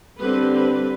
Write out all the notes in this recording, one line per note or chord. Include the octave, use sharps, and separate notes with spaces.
D3 G3 C4 B4
B4